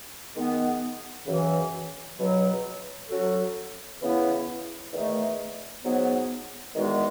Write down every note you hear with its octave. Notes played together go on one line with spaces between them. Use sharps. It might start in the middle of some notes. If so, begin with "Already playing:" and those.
D#3 G#3 B3
F#2 C#3 E3
C#2 B2 F#3
F#3 C#4 F#4 A4
C#3 E3 B3 E4
E2 D#3 A3 D#4
G#2 F#3 B3
E2 D#3 G#3 B3 F#4